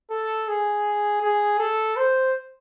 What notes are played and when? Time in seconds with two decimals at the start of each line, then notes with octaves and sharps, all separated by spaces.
0.11 A4
0.48 G#4
1.22 G#4
1.59 A4
1.96 C5